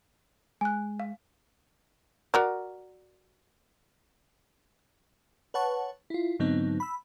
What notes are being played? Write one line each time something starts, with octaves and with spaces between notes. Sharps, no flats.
G#3 G#5 F#6
F5
F#4 A#4 D5
B4 C#5 F#5 A5 C#6
E4 F4
G#2 D3 F#3 B3 C4 D#4
B5 E6